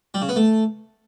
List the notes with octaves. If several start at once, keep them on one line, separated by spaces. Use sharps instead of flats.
G3
C#3
B3
A3